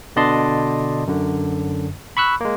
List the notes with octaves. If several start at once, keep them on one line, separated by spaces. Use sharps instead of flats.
B2 D3 D5 D#5 A5 C6
F#2 D3
B5 C#6 E6 F#6
G#3 A#3